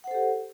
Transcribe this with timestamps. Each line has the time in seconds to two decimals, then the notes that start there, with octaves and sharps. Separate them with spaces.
0.04 F#5
0.08 C5
0.11 A4
0.15 G4